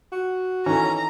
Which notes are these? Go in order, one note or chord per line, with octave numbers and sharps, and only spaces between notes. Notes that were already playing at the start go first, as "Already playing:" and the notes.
F#4
D#3 E3 C#4 A4 A#5